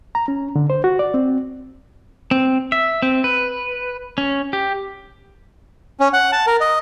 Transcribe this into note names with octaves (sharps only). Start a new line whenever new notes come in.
A#5
C#4
D3
C5
F#4
D5
C4
C4
E5
C4
B4
C#4
G4
C#4
F#5
A5
A#4
D#5